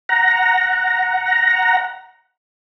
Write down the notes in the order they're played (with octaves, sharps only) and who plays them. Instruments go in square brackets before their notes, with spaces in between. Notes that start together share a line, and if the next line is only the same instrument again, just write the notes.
[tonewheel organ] F#5 A#5